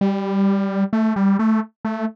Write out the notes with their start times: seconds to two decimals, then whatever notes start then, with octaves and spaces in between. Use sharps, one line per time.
0.01 G3
0.93 A3
1.16 G3
1.39 A3
1.85 A3